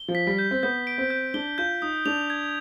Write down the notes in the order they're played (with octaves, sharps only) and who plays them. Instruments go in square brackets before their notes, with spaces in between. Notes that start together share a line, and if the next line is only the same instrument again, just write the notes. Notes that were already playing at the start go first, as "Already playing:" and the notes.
Already playing: [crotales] G7
[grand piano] F3
[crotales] B6
[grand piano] G3
[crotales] G6
[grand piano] C4
[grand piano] B3 [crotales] G6
[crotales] D7
[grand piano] C4
[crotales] G6
[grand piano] D4 [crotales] G7
[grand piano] F4 [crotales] G6
[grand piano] D#4 [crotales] D#6
[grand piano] D4 [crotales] F7
[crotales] G#6